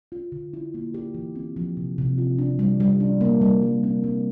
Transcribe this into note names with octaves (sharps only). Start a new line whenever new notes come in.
F4
D3
E4
A#3
G4
E3
C4
F3
C3
C3
F4
D4
G3
G3
D4
A#3
G3
G3
C4
G3